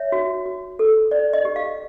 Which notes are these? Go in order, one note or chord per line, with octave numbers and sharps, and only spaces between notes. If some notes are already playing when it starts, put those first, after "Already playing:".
Already playing: C#5 E5
F#4
F#4
A4
C5 D5
D#5
G4
F5